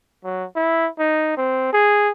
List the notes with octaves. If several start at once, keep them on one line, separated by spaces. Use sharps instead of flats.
F#3
E4
D#4
C4
G#4